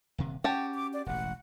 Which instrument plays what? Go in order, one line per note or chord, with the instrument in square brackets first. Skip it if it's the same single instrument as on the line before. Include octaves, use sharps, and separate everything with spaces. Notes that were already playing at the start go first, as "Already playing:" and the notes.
[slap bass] D#1 C3
[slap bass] C#4 [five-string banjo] F#4 G4 A5 [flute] G5
[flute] D6
D5
[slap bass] E1 A1 [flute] F#5